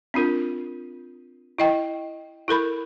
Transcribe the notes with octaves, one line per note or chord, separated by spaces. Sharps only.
C4 D4 F4 A#4
E4 D#5 G5
E4 A4 A#4 B5